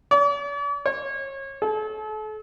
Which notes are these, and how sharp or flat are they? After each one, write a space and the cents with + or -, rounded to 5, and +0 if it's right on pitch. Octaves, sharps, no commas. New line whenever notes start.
D5 -45
C#5 -30
A4 -40